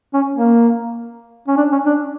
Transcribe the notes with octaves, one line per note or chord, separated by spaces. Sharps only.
C#4
A#3
C#4
D4
C#4
D4